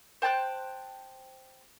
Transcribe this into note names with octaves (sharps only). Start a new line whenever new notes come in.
C5 G5 A5 F#6